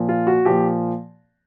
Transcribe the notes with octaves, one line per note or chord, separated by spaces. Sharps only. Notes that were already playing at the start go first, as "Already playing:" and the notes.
Already playing: A#2 F3
F4
F#4
A#2 F3 G4